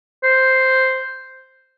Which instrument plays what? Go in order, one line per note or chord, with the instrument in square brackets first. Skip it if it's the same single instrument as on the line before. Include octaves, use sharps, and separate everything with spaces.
[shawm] C5